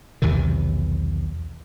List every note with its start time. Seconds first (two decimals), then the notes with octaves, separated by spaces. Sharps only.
0.22 B1 E2 C3 D#3